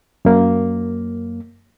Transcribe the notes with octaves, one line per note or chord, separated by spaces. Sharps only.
F#2 A#3